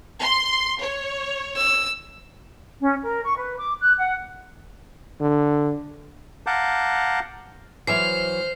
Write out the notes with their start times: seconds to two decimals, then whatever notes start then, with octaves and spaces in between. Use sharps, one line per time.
0.20 C6
0.81 C#5
1.56 E6
2.79 C#4
3.03 A#4
3.23 C#6
3.36 B4
3.58 D6
3.80 F#6
3.98 F#5
5.20 D3
6.47 F5 F#5 A5 A#5 D6 G6
7.87 E3 F#3 C5 E5 F6 C7